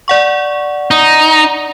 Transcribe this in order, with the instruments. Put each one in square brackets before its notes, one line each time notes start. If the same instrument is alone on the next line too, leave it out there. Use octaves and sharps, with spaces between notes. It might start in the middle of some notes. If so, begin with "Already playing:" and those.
[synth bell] D5 F#5 C#6
[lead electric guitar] D#4